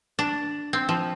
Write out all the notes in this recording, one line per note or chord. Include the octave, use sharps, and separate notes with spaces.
D4
C4
F3